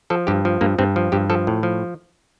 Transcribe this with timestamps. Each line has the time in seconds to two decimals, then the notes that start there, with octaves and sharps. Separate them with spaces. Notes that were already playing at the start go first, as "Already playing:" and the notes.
0.10 F3 A4
0.27 G2 G4
0.45 F3
0.61 G2 A#3
0.79 G2 C4
0.96 F3
1.12 G2 G4
1.30 F3 A4
1.47 A2
1.63 F3